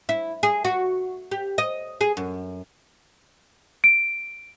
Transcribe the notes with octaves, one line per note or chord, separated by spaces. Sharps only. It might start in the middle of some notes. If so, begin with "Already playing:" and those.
E4
G#4
F#4
G4
D#5
G#4
F#2
D7